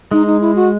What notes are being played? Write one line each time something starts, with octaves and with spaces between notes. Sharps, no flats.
G#3 D#4
D#4
E4
F#4